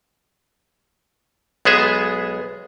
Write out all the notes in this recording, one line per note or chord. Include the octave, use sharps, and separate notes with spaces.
B1 G#3 B3 G#4 E5